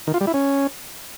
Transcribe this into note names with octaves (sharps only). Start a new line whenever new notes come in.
D#3
F4
G3
E4
C#4